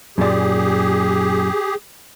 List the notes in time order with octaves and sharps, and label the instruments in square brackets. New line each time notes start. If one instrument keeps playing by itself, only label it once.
[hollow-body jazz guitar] F#2 A#2 D5 [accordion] G4 G#4